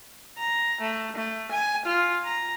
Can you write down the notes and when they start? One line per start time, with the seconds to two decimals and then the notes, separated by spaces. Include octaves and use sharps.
0.38 A#5
0.81 A3
1.16 A3
1.51 G#5
1.86 F4
2.25 A#5